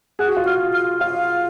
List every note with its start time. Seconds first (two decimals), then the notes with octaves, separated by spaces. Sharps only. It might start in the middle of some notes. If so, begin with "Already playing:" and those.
0.19 G#4 F#5
0.28 F#4
0.37 F4
0.45 F#4 F5
0.73 F5
1.01 F4 F5